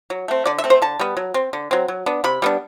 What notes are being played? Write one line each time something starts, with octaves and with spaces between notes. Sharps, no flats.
F#3
A3 C4
D3 D5
E5
A3 C4
C5
D3 A5
G3 B3
F#3
C4
D3
F#3 C4
F#3
B3 D4
C3 B5
G3 B3 D4